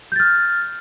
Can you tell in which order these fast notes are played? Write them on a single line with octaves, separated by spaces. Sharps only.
G6 A6 F6